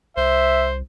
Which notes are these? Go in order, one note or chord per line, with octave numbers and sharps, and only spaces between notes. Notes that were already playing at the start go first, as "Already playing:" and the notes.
C2 C5 E5